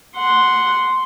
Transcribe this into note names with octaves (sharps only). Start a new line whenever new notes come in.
F#5 C6